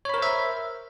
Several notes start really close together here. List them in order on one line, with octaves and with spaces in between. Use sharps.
C#5 B5 A#4 C5 E5